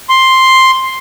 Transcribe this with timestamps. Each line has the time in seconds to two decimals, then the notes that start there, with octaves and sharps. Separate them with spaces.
0.09 C6